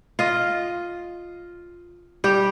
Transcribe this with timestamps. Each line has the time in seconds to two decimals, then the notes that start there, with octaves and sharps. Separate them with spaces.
0.19 F4 D#5
2.24 G3 G4